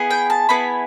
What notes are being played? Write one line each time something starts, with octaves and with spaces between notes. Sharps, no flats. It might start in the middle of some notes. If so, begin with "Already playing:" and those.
Already playing: B3 E4 G#4
G5
A5
B3 E4 G#4 B5